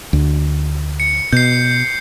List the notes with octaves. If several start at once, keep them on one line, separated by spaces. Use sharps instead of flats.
D2
C#7
B2 G6 C7